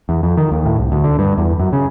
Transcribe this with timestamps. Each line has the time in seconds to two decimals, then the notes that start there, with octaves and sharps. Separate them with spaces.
0.09 E2
0.23 F2
0.37 D#3
0.52 D#2
0.66 A2
0.78 C2
0.92 D2
1.04 D3
1.19 G2
1.38 E2
1.60 F#2
1.73 C#3